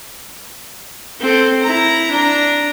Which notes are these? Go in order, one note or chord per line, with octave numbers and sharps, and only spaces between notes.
C4 A4
E4 A#5
D4 A#5